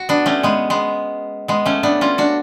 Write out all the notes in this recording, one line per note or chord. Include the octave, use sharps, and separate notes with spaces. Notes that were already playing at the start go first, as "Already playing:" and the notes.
Already playing: F#4
B3 D4
A3 C#4
G#3 B3
G#3 B3
G#3 B3
A3 C#4
B3 D4
C#4 F4
D4 F#4